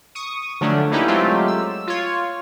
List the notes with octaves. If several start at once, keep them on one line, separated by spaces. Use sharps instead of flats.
C#6 D#6
D3 F3 F#3 A3 C#4 D4
A#3 C#4 D#4 E4 G4 B4
F#3 G#3 A3 C4 F4 G4
E6
F4 C#5